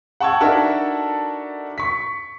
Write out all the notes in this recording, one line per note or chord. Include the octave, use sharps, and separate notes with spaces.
F#5 G5 A5 C#6 E6 G#6
D4 D#4 F#4 A4 A#4 E5
C#6 B6